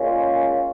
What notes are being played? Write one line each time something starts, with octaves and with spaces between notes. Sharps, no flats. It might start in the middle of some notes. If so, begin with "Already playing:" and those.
Already playing: A#2 G#3 C#4 F4